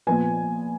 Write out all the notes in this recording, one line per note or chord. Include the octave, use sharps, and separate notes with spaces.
A#2 F3 B3 G#5